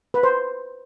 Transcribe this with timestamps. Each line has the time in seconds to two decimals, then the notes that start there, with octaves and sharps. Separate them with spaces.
0.14 B4
0.23 C5